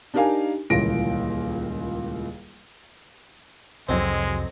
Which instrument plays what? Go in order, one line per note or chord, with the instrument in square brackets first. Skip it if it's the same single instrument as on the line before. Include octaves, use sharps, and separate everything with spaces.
[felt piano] D4 D#4 G4 A#4 F5 G#5
D#1 C#2 A#2 E3 A#6 D7
[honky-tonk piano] F1 F#3 D#5 [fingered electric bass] C2 F2 [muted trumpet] G#3 [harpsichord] C4